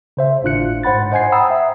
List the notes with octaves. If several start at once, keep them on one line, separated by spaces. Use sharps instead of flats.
C#3 C5 E5
G#1 A2 D4 F4 F#6 C#7
G#2 C5 F#5 B5 A6
C5 D#5 F#5 G#5 G#6 C7
F#5 G5 A#5 B5 D#6 E6
E5